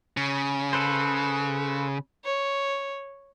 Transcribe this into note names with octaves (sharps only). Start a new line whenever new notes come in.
C#3
A4 B4 C5
C#5